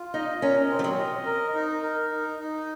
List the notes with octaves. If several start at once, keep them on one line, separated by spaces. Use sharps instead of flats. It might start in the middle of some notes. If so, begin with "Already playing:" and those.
Already playing: F4
D#4 D#5
C#4 A#4
C4
F3
F#3
D#5
A#4
D#4
A#4
D#4
D#4